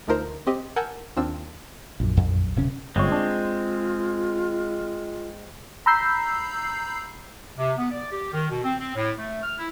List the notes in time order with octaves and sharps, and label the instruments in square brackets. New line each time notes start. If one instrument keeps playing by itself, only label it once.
[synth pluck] D2 A3 D#4 F4 A#4 C5
C4 G4 D#5
A#4 F#5 G#5 A5 E6 G6
D#2 C4 D4 F4 E6
[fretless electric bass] A#1 F#2
[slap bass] F2
D1 C3 C#4
[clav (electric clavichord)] G1 C#5 [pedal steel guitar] G#3 C4 [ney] F4
[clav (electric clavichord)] D4
[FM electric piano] A#5 B5 E6 G6 C7
[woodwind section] C3
B3
D5
G4
D#3
B2
C4
C4
A2
A3
F6
E4